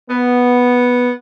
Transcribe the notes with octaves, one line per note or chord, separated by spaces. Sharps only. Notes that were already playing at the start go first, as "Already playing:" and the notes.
B3